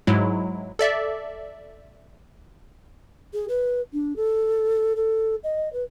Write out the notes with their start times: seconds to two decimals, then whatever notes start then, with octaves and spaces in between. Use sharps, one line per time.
0.07 G#2 F#3 G#3 E4
0.79 A4 D5 E5
3.33 G#4
3.48 B4
3.93 D4
4.16 A4
4.96 A4
5.43 D#5
5.72 B4